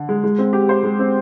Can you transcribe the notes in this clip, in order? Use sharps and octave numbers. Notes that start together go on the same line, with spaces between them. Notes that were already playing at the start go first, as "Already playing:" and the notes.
Already playing: D3
G#3
G#3
C4
G4
C5
G#3
C4